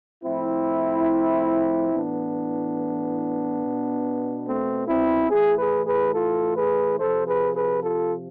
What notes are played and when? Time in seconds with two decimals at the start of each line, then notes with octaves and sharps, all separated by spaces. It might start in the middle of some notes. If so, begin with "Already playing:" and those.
0.24 A2 F3 C4 E4
1.92 A2 E3 B3 D4
3.61 B2
4.45 A3 C4
4.87 C4 E4
5.30 A2 E3 E4 G#4
5.58 G#4 B4
5.86 G#4 B4
6.14 F4 A4
6.56 G#4 B4
6.99 C3 F3 A4 C5
7.27 G#4 B4
7.55 G#4 B4
7.83 F4 A4